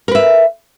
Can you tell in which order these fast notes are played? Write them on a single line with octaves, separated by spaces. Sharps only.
A#4 B4 E5